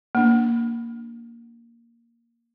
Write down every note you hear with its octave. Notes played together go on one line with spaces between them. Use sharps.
A#3 D4